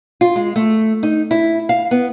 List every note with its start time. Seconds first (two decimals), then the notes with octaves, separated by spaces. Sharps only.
0.21 F4
0.36 G#3
0.56 A3
1.03 D#4
1.31 E4
1.69 F5
1.91 B3